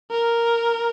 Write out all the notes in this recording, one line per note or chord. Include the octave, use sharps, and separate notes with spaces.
A#4